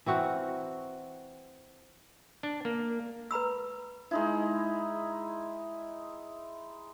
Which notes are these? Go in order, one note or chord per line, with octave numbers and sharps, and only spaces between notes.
E3 C4 F#4 A#4
D4
A#3
B4 A#5 B5 E6
G#3 D#4 E4